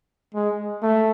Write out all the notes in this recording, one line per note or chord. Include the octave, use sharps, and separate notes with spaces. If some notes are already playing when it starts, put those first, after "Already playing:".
G#3
A3